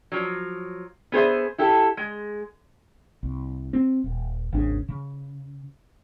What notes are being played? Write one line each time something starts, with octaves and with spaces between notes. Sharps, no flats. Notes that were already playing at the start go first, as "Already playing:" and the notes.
F3 F#3
B3 G#4 C5 E5
E4 G4 A4
G#3
C2
C4
D#1
G#1 D#2 C#3 D4
C#3